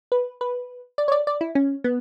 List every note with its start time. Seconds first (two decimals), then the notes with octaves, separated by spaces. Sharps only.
0.12 B4
0.41 B4
0.98 D5
1.08 C#5
1.12 D5
1.27 D5
1.41 E4
1.55 C#4
1.84 B3